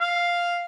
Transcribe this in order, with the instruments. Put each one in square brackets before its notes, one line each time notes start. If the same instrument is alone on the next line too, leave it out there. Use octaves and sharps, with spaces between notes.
[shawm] F5